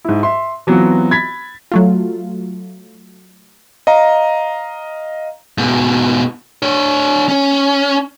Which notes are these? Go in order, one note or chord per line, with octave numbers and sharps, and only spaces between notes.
G#2 E4
E5 C6
E3 F#3 B3 C4 F4 F#4
B5 G#6 A6 B6
F#3 A3 F4
D#5 F5 A#5
G#2 B2
D4 C#5
C#4